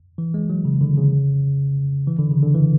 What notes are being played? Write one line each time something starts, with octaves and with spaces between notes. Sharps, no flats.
E3
G#3
F#3
C#3
D3
C#3
E3
D3
C#3
D3
E3